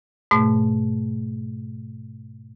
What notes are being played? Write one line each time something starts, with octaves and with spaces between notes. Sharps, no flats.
G#2 B2 A3